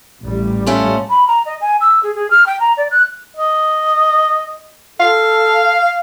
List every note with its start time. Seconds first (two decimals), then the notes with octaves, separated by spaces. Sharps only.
0.22 A1 G3
0.66 A3 C#4 F4
1.09 B5
1.28 A#5
1.46 D#5
1.61 G#5
1.81 E6
2.03 G#4
2.15 G#4
2.31 F6
2.46 G5
2.60 A#5
2.77 D5
2.91 F#6
3.37 D#5
5.00 A4 F5